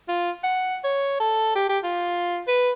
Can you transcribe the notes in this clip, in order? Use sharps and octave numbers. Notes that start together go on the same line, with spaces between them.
F4
F#5
C#5
A4
G4
G4
F4
B4